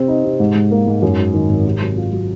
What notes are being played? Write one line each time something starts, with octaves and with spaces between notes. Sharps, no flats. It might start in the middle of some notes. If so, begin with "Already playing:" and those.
Already playing: C3 C4
D#4
C3
G#2
G#2
A#3
G#2
F#2
F#3
D#3
G#1
C3
F#3
F4
F#3